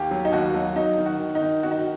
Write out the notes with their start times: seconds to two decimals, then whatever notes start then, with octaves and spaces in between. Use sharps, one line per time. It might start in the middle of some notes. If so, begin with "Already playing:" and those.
Already playing: D#2 G4
0.11 F#3
0.25 D#4
0.32 D#2 F#4
0.54 F#3
0.76 F#3 D#4
0.98 D#3
1.06 F#4
1.20 D#3
1.35 D#4
1.42 D#3
1.63 D#3 F#4
1.71 D#4
1.79 F#4